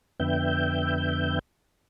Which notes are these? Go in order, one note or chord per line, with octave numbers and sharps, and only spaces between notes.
F2 D3 B3 E5 G5 G6